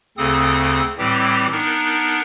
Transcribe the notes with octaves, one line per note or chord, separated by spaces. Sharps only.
D2 C#3 C4 A4 D#6
A2 E3 G3 C4 G4
B3 D4 D#4 A#4